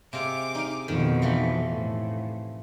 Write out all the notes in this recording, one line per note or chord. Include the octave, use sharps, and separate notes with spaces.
C3 G#3 F5 D6
D#4 F5
F2 B2 D#3
E3 F3 D#4
A2